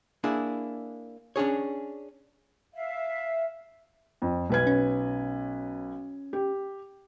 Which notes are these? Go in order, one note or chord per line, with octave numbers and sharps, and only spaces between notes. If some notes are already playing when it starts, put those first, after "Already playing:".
A#3 D4 E4 G#4
C#4 D4 G#4 C#5
E5 F5
F2
B1 B4 G#6
C#4
G4